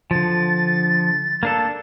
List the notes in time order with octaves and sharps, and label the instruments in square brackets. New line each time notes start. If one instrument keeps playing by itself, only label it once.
[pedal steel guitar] D3 F3 [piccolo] A6
[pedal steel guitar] A#3 D4 A4